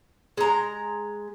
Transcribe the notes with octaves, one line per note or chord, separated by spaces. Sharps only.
G#3 A#5